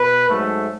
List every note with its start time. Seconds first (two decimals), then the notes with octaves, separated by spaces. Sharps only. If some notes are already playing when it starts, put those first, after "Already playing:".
Already playing: B2 B4
0.29 G#2 F#3 A3